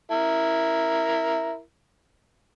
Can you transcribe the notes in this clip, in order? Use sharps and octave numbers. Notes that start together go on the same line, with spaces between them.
E4 A#4